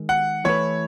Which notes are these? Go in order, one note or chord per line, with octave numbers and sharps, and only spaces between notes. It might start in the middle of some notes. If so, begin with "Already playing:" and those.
Already playing: D#3 G#3
F#5
E3 A3 E4 B4 C#5